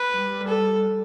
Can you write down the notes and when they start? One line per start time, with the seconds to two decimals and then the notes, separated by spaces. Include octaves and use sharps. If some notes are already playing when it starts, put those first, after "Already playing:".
Already playing: B4
0.14 G3
0.47 A4